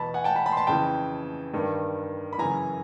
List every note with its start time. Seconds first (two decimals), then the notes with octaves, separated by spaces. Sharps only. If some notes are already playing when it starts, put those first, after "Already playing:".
Already playing: E2 B2 A5 B5
0.14 F#5 G#5
0.24 G5 A5
0.36 A5 B5
0.46 A5 B5
0.52 C6
0.57 A5 B5
0.67 F2 C#3 E3 G5 A5
1.54 G2 D#3
2.33 B5
2.38 F#2 C#3 E3 G#5 A#5